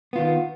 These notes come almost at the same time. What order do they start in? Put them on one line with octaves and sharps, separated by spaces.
B3 F4 D#3